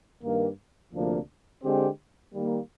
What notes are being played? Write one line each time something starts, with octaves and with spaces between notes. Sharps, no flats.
G2 D#3 A#3
D2 C3 F3 A#3 D4
D3 G#3 C4 G4 C5
D#3 G3 A#3